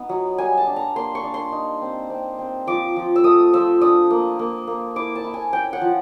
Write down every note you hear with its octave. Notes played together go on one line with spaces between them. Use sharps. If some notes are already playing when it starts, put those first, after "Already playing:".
Already playing: B3 D#4
F#3
G3 G#5
A5
D4
A#5
A#3 C6
C#6
D4
C6
D#4
C4
C4
C4
F3 D6
F3
E6
A3 D#6
F3 E6
D4 D#6
A#3
A#3
A#3
E4 D6
A5
E4
G#5
C#4 G5
F#5
F3